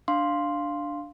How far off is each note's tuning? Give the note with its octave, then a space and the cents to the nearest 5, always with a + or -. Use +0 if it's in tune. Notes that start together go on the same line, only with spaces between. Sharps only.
D4 +0 F5 +0 C6 +0